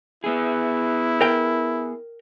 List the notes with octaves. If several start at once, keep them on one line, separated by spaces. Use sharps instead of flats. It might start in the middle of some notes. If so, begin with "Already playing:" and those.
B3 E4 G#4
A#4 G5